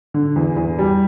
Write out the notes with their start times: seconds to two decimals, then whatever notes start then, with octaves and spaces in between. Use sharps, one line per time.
0.14 D3
0.36 E2
0.57 E2
0.79 G3